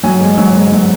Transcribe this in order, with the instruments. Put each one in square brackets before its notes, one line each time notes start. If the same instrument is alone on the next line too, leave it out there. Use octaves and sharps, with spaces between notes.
[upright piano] F#3 G#5
G#2
F#3
G#2
F#3